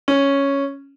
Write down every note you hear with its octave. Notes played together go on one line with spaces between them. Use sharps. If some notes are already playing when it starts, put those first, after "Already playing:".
C#4